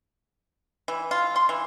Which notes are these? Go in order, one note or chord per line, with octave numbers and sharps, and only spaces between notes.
E3
F4
C6
E3